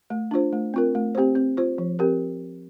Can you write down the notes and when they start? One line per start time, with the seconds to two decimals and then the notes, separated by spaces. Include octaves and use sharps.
0.10 A3
0.31 D4 F4 C5
0.53 A3
0.74 C4 F4 A#4
0.95 A3
1.15 C4 G4 C5
1.35 C4
1.57 F4 C5
1.78 F3
1.99 C4 G4 A#4